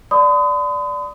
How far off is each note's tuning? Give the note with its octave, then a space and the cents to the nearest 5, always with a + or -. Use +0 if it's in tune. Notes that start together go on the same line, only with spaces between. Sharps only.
D5 -10 B5 +45 D#6 +0